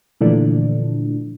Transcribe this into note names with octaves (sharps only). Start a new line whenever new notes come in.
A#2 D3 E3 F3 A3 D4